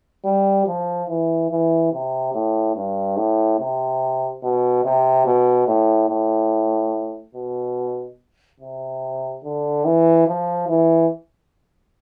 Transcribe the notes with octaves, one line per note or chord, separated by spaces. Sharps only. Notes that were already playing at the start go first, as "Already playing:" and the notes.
G3
F3
E3
E3
C3
A2
G2
A2
C3
B2
C3
B2
A2
A2
B2
C3
D3
E3
F3
E3